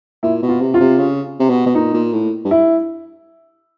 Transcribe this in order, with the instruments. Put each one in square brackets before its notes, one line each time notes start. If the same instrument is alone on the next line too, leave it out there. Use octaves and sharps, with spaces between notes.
[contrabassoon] A#2 [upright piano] E4
[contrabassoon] B2
[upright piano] F4
[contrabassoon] C3
[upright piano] F4
[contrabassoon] C3
C#3
C3
B2
B2
[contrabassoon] A#2 [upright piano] D#4
[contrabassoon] A#2
A2
G2
[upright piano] E4